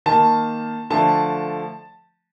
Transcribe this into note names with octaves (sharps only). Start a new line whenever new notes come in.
D#3 A#3 A5
D3 F3 A3 A5